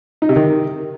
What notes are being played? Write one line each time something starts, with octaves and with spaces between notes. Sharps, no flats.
D#4
C3
D#3